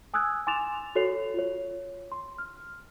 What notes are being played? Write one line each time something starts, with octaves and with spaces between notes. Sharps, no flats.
G#5 D#6 E6 F#6 G#6
G#5 C6 D6 A6 E7 F7
F#4 A4 C#5 C7 F7
F4 C#5
C6
F6